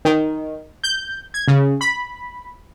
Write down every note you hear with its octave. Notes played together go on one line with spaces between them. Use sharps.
D#3
G6
G#6
C#3
B5